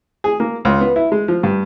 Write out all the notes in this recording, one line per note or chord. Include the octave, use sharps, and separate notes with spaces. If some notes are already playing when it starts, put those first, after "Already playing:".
G#4
A#3
C#2
B3
E4
G#3
F3
G2